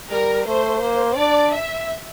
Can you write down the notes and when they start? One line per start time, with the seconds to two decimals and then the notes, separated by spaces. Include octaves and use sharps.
0.10 G3 A#4
0.46 A3 C5
0.81 A#3 C5
1.16 D4 D5
1.52 E5